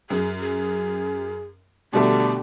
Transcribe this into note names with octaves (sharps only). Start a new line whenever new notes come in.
F#2 G#4
G#4
B2 D3 G3 A3 G4